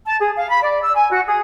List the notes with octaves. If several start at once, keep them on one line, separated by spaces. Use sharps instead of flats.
A5
G#4
F5
B5
D5
E6
G#5
F#4
G#4